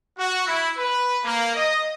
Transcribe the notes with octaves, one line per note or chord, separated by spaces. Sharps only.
F#4
E4
B4
A#3
D#5